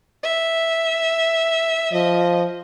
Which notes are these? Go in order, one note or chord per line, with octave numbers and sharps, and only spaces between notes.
E5
F3 D#5